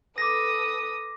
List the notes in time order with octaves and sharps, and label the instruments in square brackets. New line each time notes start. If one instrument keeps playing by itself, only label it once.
[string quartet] A4 B4 D#6 [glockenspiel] D6 A#6